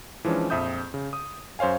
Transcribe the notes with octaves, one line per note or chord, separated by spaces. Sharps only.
E3 F3 G#3 C#4 D4
A#1 F2 E5 D#6 G6
C#3
D#6
F#2 C5 C#5 F5 G#5